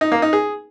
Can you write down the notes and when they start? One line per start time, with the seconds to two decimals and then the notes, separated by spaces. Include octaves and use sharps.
0.01 D#4
0.12 A#3
0.22 D#4
0.33 G#4